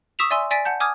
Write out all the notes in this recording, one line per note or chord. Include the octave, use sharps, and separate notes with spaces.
C#6 D#6 E6 B6 E7 F7
D5 E5 G#5 C6 E6
D5 G#5 A6 B6 D7
F#5 A5 G6
G#5 D6 D#6 F6 G#6